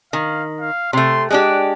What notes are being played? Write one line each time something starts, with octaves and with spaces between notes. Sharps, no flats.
D#3 F5
F5
C3 A3 C6
G#3 D4 G4 F#6